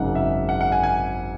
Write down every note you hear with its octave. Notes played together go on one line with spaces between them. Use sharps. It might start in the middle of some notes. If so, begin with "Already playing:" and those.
Already playing: G#1 F#2 C#3 G#3 D#4 F#5
E5
F#5
F#5
G#5
G#5